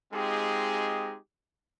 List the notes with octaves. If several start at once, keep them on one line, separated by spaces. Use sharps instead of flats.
G#3 C4 D#4 F4 G4 G#4